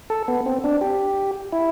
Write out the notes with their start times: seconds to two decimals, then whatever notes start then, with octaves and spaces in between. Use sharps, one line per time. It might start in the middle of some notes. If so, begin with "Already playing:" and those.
0.10 A4
0.28 B3
0.46 C4
0.64 D4
0.81 G4
1.53 E4